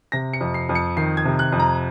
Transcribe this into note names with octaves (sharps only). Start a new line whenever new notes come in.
C3 A#6
C#7
F2
C7
F2
C#7
D#3 C7
G#6
C3
F#6
F2
A#5